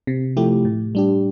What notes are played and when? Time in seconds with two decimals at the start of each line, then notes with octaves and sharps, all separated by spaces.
0.07 C3
0.37 F3 A3 E4 G4
0.65 A2
0.95 G3 D4 G4